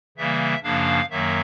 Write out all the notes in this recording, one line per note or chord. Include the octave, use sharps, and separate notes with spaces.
C#3 E3 G3 A#3 E5
F#2 C#3 F3 A#3 D4 F5
F#2 D#3 F#3 A#3 E5